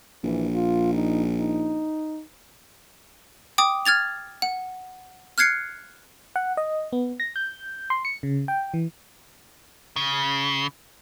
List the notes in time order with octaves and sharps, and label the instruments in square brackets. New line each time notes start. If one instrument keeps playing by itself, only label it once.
[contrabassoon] A#1 [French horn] E3
[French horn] F4
D#4
D#4
[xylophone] G5 D6 D#6
F6 G#6 A6 F7
F#5
F6 F#6 G#6 C7 C#7
[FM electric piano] F#5
D#5
B3
A#6
G6
C6
C#7
C#3
G5
E3
[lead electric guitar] C#3